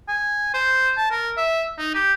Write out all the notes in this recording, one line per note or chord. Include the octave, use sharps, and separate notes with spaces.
G#5
C5
A5
A#4
E5
D#4
G4